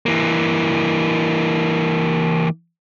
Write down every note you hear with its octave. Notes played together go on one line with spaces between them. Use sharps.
E3 A#3